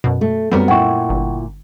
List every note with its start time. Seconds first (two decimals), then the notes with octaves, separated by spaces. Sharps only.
0.04 F#2 B2
0.21 A3
0.52 F#2 G3 B3 C4 F#4 A#4
0.68 A#2 E4 F#5 G5 C#6
1.09 G1